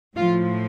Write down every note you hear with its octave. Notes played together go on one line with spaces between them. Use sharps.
A2 F3 F4